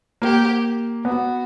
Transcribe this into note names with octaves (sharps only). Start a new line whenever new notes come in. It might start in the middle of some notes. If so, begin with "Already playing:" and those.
A#3 G4
B3 F#4